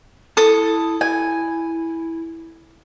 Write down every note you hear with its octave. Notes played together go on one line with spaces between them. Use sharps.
E4 A4 D#6
E4 G#5